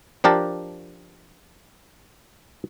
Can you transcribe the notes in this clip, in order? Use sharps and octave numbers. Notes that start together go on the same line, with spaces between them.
F3 D4 G4 A#4 A5